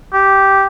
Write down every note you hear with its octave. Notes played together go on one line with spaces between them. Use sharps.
G4